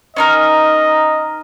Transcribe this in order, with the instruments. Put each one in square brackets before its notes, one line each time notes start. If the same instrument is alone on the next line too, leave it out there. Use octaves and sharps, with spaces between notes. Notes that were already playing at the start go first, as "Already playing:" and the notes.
[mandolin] C#4 D#4 A#4 [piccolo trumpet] D#5